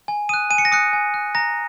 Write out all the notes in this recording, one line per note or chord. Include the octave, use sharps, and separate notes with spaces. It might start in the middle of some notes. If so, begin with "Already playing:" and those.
G#5
D#6 F#6 D#7
G#5 D#7
C#7
A#6
D#6 F#6 C#7
G#5
F#6
A#5 A#6